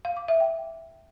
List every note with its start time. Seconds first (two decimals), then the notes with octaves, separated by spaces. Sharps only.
0.05 F5
0.17 D6
0.28 E5
0.40 G5